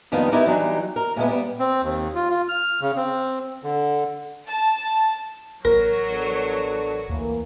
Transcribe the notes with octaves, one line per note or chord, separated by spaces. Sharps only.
F2 D#3 G3 A#3 B3
B3 D#4 E4 G4 A#4 B4
E3 F#3 G3 D4 D#4
A#4
A#2 G#3 A3 B3
G3 B3
C4
D#2
F4
F4
F6
C#3
C4
D3
A5
A1 F#3 F#4 A#4
B3 D4 A4
D2 E3 A#3